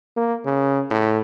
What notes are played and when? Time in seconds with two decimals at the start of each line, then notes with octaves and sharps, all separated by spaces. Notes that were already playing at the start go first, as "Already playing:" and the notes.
0.17 A#3
0.45 C#3
0.91 A2